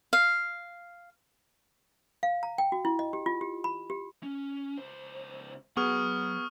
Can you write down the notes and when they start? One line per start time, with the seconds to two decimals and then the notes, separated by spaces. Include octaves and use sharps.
0.13 F5
2.23 F5
2.43 A#5
2.58 G5
2.72 F#4
2.85 E4
2.99 D#5
3.13 G4
3.26 F4
3.41 G4
3.64 B5
3.90 G4
4.23 C#4
4.78 C#2 C5
5.77 F#3 B3 F#4 G#4 C#6 D#6 F6